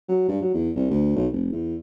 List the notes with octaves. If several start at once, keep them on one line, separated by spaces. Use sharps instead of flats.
F#3
G2
F#3
E2
C2
D2
B1
F1
E2